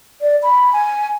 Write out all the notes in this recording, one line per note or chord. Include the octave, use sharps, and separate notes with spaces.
D5
B5
G#5